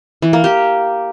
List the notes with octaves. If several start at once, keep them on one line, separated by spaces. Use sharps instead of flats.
E3
A#3
G4